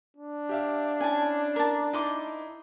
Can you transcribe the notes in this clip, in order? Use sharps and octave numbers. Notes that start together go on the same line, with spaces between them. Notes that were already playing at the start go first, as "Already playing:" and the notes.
D4
G4 E5 F5
C#4 E4 G#5 A5
A#4 A5
D#4 E4 D#5 C6 D6